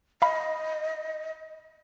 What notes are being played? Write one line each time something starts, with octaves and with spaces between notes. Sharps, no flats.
D#5 F5 B5